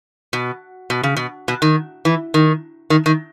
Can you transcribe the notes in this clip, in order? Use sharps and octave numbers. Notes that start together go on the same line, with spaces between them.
B2
B2
C#3
B2
B2
D#3
E3
D#3
D#3
D#3